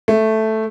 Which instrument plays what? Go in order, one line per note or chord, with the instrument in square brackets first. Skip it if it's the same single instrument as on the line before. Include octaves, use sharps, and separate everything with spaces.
[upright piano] A3